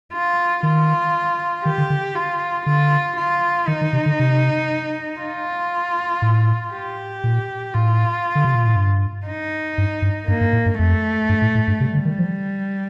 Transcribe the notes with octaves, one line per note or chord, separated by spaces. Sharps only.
F4
D#3 F4
D#3 G4
D3
D3
F4
D3 F4
F4
D#3 D#4
D#3
C3
D3
C3
F4
A2
G4
A#2
A2 F4
D3
C3
A#2
A2
G2
D#4
G2
G2
G2 A#3
G2
A2
G2
F2 A3
G2
A2
A2
G2
C3 G3
D3
D#3
F3